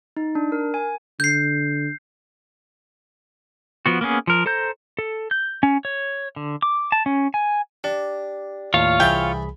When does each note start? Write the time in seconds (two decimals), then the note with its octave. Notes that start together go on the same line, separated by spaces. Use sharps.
0.17 D#4
0.35 D4
0.52 A#4
0.74 G#5
1.20 D3 G6 C7
3.86 F3 B3 F#4
4.01 A#3 B3 C#4 G#4
4.27 F3 A#4
4.46 A4 C5 A#5 G6
4.99 A4
5.31 G6
5.63 C#4
5.85 C#5
6.36 D3
6.62 D6
6.92 A5
7.06 C#4
7.34 G#5
7.84 D4 G4
8.74 D#2 A2 F4 C#5 F5
9.00 C2 E3 G#4 E5 G5 A5 B5